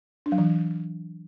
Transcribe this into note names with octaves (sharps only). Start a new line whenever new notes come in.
D4
F#3
E3